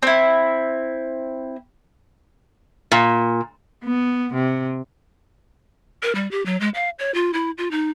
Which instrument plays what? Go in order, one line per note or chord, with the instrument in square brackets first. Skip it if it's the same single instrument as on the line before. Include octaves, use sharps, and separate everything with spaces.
[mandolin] C4 E4
[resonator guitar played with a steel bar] A#2
[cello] B3
C3
[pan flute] A#4
G3
G4
F#3
G#3
F5
C#5
F4
E4
F4
D#4